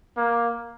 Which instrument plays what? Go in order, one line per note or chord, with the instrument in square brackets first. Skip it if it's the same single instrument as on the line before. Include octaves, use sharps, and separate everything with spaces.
[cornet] A#3